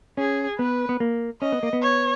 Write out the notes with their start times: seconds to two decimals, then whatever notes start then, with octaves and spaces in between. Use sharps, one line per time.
0.17 C#4 G#4
0.59 B3 B4
0.89 B3
1.00 A#3
1.42 C#4 D#5
1.52 B3
1.63 A#3
1.73 B3
1.82 C#5